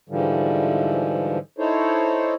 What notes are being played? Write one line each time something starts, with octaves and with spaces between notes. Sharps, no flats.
G#2 D3 E3 F3 G3
D#4 E4 A4 C5 C#5